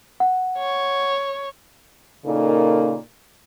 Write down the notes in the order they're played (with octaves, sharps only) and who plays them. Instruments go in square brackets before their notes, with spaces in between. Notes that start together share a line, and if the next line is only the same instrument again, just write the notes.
[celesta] F#5
[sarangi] C#5
[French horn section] A#2 C#3 A#3 D#4 A4